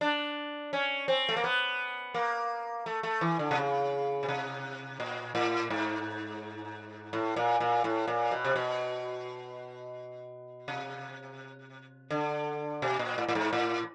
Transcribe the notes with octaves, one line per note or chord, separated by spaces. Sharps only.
D4
C#4
C4
A3
A#3
B3
A#3
A3
A3
E3
D3
C3
C#3
B2
C3
A#2
A2
G#2
A2
A#2
A#2
A2
A#2
B2
C3
B2
C3
D3
B2
A#2
A2
A2
G#2
A2